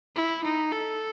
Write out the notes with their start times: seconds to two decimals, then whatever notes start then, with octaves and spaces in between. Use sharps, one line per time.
0.16 E4
0.44 D#4
0.72 A4